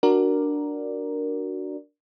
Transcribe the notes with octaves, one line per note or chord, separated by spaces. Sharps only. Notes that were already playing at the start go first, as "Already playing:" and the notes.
D4 F#4 A#4 D5